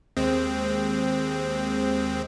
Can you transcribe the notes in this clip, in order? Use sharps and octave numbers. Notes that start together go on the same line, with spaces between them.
D#2 G#3 C4